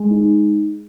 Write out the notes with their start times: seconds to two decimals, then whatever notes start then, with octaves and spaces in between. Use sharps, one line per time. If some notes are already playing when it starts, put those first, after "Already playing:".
Already playing: G#3
0.10 D#4